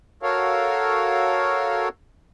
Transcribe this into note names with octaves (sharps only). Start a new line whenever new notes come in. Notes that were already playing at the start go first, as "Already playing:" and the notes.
F#4 A4 A#4 C#5 F5